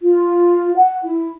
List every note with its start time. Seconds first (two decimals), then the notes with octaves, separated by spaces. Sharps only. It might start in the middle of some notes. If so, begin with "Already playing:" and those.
0.01 F4
0.75 F#5
1.03 E4